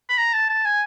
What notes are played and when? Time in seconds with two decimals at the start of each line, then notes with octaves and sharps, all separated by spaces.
0.09 B5
0.18 A#5
0.34 A5
0.49 A5
0.65 G#5